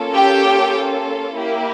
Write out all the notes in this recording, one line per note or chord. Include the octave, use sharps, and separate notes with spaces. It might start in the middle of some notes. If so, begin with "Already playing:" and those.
Already playing: A#3 C#4 F4 A4
G4 G5
A#3 E4 G4